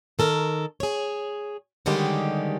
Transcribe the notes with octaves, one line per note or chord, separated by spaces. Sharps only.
D#3 A4 A#4
G#4 C#5
D3 D#3 G3 G#3 C#4 G4